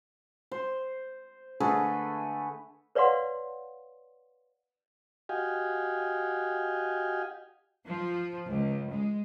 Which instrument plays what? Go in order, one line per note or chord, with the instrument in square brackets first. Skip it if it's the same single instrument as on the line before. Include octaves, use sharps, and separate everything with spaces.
[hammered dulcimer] C5
D3 A3 G#4 B4
[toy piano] B4 C#5 D5 F5 F#5 C6
[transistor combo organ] F#4 G4 D#5 F5 G5 G#5
[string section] F3
C#2
G#3